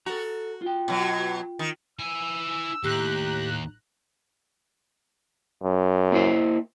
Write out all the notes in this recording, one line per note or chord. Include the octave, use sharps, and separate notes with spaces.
F#4 A4 A#5
F4 G5
B2 F#3
D#3
E4 G#5 E6
D#2 A2 G4 A#5 F#6
F#2
A#3 E4 C5